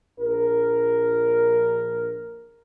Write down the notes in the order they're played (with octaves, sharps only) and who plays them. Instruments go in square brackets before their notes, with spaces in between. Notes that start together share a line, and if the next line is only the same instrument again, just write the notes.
[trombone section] A#1 A#4